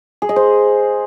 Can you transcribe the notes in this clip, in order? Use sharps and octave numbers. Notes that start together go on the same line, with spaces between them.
G#4
D#5
C5